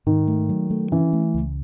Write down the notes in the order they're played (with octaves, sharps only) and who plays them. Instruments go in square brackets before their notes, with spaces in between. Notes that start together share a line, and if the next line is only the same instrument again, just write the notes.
[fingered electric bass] G#2 [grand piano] D#3
[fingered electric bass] A3
F#3
A3
[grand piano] E3 [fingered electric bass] C#4
[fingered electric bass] A3
C#2